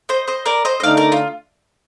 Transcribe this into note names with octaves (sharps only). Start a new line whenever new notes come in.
C5 D#5
C5 D#5
A#4 D5
C5 D#5
D#5
D3 A3 D#4 D5 F5
A#4 D5
F4